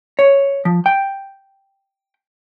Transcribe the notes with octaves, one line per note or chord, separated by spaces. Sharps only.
C#5
F3
G5